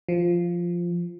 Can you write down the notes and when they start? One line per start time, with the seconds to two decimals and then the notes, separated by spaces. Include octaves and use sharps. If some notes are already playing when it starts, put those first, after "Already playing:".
0.09 F3